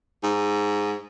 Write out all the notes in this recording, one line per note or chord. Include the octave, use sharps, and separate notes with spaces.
G#2